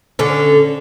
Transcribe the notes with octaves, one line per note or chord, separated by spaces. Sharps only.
D3 C#4